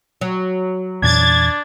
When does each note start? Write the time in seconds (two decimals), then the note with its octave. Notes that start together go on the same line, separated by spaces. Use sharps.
0.21 F#3
1.02 E2 A#2 E3 D4 G#6 A6